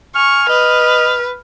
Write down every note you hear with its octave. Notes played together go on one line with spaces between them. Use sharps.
G#5 C#6 F6
B4 D#5